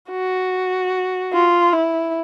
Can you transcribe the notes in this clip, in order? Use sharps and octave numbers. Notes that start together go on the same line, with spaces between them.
F#4
F4
E4